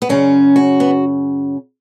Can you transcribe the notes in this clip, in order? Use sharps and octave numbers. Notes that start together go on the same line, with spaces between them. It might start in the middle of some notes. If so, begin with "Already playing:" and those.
B3
F#2 C#3 C#4
F#4
B3